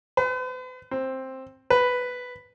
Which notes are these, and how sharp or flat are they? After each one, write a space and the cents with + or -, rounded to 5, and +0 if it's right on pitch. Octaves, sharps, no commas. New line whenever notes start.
B4 +45
C4 +10
B4 +5